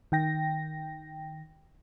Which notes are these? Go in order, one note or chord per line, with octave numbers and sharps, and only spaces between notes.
D#3 G5 A#6